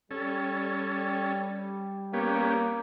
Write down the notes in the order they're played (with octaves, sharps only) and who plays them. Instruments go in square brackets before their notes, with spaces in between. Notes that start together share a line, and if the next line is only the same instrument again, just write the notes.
[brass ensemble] G3 [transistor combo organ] C#4 A4
[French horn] A#3 [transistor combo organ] B3 C#4 G4